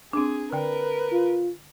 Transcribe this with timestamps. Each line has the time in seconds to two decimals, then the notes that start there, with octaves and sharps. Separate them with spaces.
0.13 C4 D4 G#4
0.53 D3 A#4 B4 G5
1.12 F4